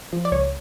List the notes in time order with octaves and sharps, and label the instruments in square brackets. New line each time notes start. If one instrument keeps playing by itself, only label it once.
[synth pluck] F3
D5
C#2 C#5